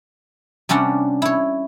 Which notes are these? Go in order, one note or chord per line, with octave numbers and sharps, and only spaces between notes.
C3 G3 C#4 D4 F#5
E4 C#5